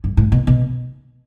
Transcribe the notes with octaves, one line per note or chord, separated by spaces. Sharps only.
G2
A2
B2
B2